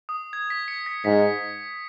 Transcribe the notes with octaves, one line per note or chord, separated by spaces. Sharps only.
D#6
G#6
B6
C#7
B6
G#2 B6